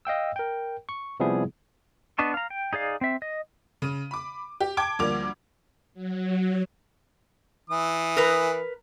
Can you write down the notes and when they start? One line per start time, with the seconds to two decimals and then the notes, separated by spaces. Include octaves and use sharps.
0.05 D#5 F5 G5 E6
0.36 A#4 G5
0.89 C#6
1.20 C3 F3 G3 B3 E4 G#4
2.19 B3 D4 D#5 A5 C#6
2.34 F5 A#5
2.50 G5
2.73 D#4 G#4 D5 F5
3.01 C4 E5
3.22 D#5
3.82 C#3 D#7
4.11 B5 D6
4.61 G4
4.77 G5 A5 D6 G#6 D7
4.99 D2 F3 G3 A#3 D6 F7
5.94 F#3
7.70 E3 D#6
8.17 A#4 B4